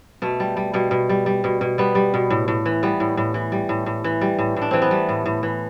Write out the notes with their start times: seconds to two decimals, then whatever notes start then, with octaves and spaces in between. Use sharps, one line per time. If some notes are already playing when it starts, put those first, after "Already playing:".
0.22 B2 A3
0.40 G3
0.57 G3
0.74 B2 G3
0.91 B2
1.09 G3
1.26 G3
1.44 B2
1.61 B2
1.78 G3 B3
1.95 G3
2.14 B2
2.30 A2
2.48 A2
2.66 E3
2.83 G3 B3
3.00 A2
3.17 A2
3.34 E3
3.52 G3
3.69 A2
3.86 A2
4.04 E3
4.21 G3
4.39 A2
4.56 A2
4.61 D4
4.71 E3 C4
4.82 B3
4.91 G3 A3
5.09 A2
5.26 A2
5.43 E3